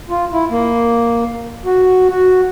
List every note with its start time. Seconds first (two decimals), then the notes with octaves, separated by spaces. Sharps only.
0.10 F4
0.33 E4
0.51 A#3
1.65 F#4
2.09 F#4